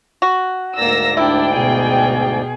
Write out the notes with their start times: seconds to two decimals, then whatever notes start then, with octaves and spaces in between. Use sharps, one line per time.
0.22 F#4
0.77 D2 G#2 A#3 D5 E6 A#6
1.17 D4 E4 G5
1.53 B2 G#4